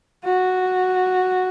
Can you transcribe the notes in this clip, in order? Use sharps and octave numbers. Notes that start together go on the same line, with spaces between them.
F#4